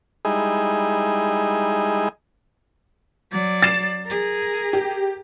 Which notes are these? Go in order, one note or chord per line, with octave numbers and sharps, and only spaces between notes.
G3 G#3 D#4 E4 G#4 D#5
F#3 D5
A6 C7 E7
G#4 A#4
G4